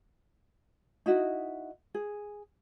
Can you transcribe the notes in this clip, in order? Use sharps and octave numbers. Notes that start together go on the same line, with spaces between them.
D#4 E4 F#4 D#5
G#4